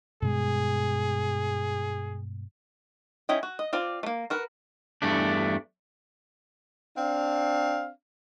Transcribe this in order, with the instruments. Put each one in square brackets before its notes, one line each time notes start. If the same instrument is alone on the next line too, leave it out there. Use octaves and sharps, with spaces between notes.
[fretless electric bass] G2 B2 G#3 [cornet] G#4
[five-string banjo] C#4 E4 D#5 G5
F#4
D#5
C4 F4 D5
A3 A#3
F#4 A#4 B4
[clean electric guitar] E2 G2 A3 D4
[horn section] C4 D4 F5